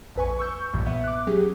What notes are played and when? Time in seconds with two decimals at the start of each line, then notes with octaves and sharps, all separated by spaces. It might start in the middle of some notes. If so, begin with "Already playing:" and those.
0.15 A#1 F2 B4 G#5 C#6
0.39 C#6 E6 G6
0.73 B1 G2 A#2 E3
0.86 B3 E5
1.04 D6 F#6
1.27 F#3 C#4 G4 G#4